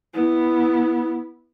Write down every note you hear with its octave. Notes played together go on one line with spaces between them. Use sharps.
B3 E4